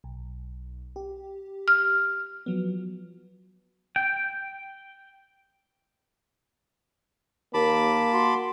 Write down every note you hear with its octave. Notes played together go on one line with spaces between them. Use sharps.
B1
G4
F6
F3 F#3 B3
G5
D#2 A#3 A5 B5 D6
F#4 C6